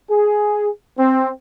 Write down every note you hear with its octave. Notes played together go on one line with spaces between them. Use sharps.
G#4
C4